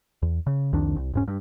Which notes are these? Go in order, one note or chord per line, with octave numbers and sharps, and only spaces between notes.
E2
C#3
C2 F2 D#3 D4
C2
E1 G#2 C#4
G2